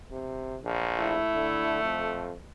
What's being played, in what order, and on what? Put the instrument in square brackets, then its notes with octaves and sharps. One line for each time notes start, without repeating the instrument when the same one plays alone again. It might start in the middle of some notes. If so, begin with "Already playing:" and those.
[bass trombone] C3
A#1
[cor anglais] A3 [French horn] E4
[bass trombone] D3
F2